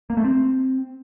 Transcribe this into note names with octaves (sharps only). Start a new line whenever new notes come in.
A#3
A3
C4